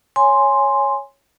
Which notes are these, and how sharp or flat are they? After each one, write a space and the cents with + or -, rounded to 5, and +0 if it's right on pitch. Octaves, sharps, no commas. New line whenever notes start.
C#5 +0 G#5 +0 C6 +0